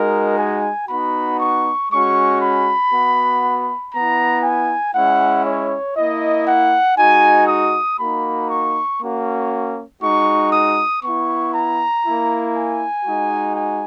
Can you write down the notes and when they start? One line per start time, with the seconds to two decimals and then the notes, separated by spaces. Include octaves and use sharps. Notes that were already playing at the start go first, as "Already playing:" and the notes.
Already playing: G#3 D#4 F#4 A#4
0.39 G#5
0.89 B3 D#4 F#4 B5
1.40 C#6
1.91 G#3 C#4 F#4 C#6
2.41 B5
2.92 B3 F#4
3.94 B3 E4 A#5
4.44 G#5
4.94 G#3 C#4 E4 F#5
5.45 C#5
5.97 A#3 E4 D#5
6.48 F#5
6.97 G#3 D#4 F#4 G#5
7.48 D#6
7.99 A#3 D#4 F#4 B5
8.50 C#6
9.00 A#3 C#4 F#4
10.02 G#3 D#4 F#4 C#6
10.53 D#6
11.03 B3 E4 C#6
11.55 A#5
12.05 A#3 E4
12.55 G#5
13.06 G#3 D#4 F#4
13.56 G#5